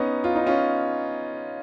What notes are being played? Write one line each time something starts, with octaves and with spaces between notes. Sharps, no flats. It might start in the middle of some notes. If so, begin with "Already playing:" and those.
Already playing: B3 C#4 D#4
F4
D#4
C#4 F4